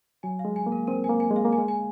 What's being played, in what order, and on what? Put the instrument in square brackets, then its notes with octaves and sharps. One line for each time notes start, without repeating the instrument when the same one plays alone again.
[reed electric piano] F#3 [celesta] G#5
[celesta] F5
[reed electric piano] G#3
[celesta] G#5
[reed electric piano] A#3
[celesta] A#4
[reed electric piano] C4 [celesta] A#4
[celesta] G#5
[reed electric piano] A#3
[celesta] G#5
[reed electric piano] G#3
[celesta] F5
[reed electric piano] A#3
[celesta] G#5
[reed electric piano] G#3
[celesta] G#5